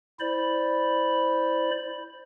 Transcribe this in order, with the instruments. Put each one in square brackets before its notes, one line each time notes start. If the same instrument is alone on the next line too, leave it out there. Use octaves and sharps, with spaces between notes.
[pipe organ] E4 C5 D5 B5